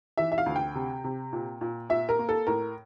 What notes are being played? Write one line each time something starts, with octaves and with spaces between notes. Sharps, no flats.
E3 E5
E5
F5
D2
G5
C3
C3
A#2
A#2
A#2 E5
A#4
A#3
A4
A2 A#4